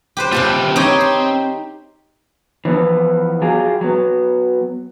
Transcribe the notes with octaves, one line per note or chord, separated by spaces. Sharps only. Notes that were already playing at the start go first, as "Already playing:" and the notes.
G4 B4 C5
C3 A#3 F4 G4 B4 A5
C4 D#4 G4 C#5
C6
E3 F3 B3
F#3 F4 G4 G#4
F#3 B3